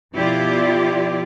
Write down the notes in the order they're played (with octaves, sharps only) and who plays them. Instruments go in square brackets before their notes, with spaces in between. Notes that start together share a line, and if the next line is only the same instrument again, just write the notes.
[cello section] B2 F3 E4 F4 G4 D5